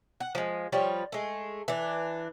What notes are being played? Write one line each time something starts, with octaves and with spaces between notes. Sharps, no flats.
F#5
F3 G#3
F3 G3 F4 C#5
G#3 A3
E3 D4